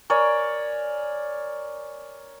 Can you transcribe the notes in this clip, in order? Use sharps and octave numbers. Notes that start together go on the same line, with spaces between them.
A#4 C#5 D5 G#5